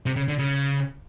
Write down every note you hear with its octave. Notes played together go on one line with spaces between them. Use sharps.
C3
C#3
D3
C#3